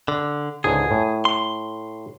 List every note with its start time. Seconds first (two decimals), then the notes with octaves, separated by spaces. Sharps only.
0.08 D3
0.64 C#2 G#2 D3 G#4
0.91 A2
1.25 C6